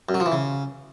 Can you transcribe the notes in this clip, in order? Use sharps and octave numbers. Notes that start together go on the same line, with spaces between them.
F#2
F#3
F3
E3
C#3